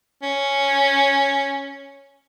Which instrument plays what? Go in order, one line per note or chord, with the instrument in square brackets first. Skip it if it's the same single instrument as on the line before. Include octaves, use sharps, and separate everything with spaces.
[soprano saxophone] C#4